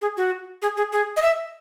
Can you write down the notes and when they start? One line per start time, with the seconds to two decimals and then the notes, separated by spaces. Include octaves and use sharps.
0.02 G#4
0.17 F#4
0.62 G#4
0.77 G#4
0.92 G#4
1.17 D#5
1.22 E5